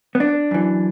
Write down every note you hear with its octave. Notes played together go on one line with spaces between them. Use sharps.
B3
D4
F#2 E3